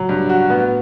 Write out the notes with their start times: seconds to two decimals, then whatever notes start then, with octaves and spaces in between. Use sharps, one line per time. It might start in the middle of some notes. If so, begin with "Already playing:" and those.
Already playing: A2 C#3 F#3
0.09 G2
0.30 F#4
0.50 A2 B3